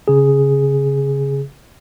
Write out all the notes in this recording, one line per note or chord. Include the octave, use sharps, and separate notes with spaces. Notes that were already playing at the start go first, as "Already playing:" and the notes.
C#3 G#4